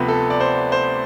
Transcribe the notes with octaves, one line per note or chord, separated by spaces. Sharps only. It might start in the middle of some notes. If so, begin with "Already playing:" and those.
Already playing: D2 C3 F3 B3
A4
D5
C5
C5